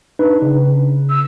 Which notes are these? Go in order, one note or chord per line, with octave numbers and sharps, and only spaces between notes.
D4 D#4 B4
C#3
E6